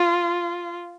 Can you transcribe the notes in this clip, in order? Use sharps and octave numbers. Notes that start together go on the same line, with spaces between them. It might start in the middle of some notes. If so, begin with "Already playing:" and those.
Already playing: F4